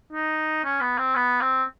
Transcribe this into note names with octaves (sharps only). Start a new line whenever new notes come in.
D#4
C#4
B3
C4
B3
C4